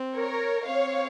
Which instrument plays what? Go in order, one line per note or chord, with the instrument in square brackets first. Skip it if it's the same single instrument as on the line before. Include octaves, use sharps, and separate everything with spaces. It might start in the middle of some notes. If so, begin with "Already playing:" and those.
Already playing: [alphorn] C4
[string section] A#4 C#5
[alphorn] C4 [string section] C#5 F5